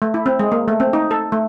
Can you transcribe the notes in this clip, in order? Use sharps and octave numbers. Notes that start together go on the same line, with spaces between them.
A3
E4
C4
G#3
A#3
A3
C4
D#4
A4
A3